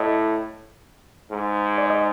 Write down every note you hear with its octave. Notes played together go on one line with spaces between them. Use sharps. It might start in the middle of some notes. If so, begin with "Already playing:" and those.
Already playing: A2 D#5
G#2
D5
D#5